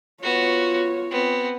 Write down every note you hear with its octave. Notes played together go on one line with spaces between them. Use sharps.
B3 F4 F#4 C#5
B3 C4